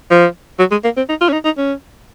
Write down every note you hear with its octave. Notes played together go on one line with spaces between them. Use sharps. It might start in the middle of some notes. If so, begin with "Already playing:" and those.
F3
F#3
G#3
A#3
C4
D#4
F4
C#4
D#4
D#4
C#4